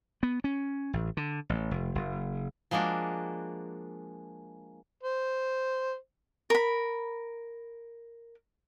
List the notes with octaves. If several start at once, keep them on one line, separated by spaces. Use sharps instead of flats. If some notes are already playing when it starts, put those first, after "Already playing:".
B3
C#4
A1
D3
A1
F1
F#1
F3 G#3 A#3 D4 F#4
C5
A#4 B5